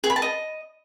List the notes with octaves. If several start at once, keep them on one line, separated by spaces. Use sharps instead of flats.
G#4
B5
A5
D#5